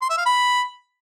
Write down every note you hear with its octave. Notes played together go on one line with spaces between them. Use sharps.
C6
E5
F5
B5